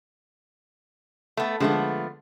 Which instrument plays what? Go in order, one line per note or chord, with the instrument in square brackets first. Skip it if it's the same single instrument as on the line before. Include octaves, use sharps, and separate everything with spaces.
[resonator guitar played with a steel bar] A3 B3
[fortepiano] D3 G#3 [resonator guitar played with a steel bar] F3 A3 B3